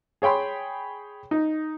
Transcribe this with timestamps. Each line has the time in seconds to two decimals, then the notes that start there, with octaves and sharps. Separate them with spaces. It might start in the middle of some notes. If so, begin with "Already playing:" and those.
0.22 G#4 C#5 G5 B5 C6
1.31 D#4